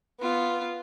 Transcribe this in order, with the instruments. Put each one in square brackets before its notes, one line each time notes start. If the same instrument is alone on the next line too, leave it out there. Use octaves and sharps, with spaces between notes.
[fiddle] B3 F4